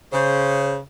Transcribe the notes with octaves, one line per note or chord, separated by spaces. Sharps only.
C#3 C5